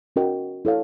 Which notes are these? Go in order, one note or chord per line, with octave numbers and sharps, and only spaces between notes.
C#4 F#4 A#4 D#5 G5
E4 A4 C#5 F5